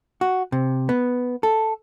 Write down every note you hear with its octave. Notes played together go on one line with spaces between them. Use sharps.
F#4
C3
B3
A4